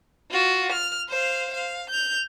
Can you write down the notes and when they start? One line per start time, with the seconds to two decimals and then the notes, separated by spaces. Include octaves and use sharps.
0.31 F4 F#4
0.72 F6
1.09 C5 F5
1.54 F5
1.90 G6 F7